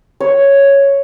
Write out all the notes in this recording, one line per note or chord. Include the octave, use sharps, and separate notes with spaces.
C#5